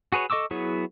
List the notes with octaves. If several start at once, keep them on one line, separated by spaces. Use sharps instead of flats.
F#4 G#4 B4 C#5
A4 D#5 C#6 D6 E6
F#3 B3 E4 G#4 C#5